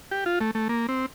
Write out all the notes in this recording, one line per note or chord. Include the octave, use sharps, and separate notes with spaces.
G4
F4
A3
A3
A#3
C4